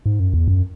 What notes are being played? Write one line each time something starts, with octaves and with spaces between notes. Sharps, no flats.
G#2
F#2
E2
F#2